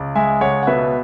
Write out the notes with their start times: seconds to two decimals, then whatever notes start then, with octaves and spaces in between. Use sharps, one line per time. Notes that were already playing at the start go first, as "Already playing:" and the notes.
Already playing: C#2
0.15 G#3 E5 G#5
0.41 C#2 C#5 F#5
0.63 F#5
0.67 B2 B4 E5